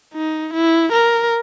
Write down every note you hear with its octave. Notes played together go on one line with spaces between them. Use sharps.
D#4
E4
A#4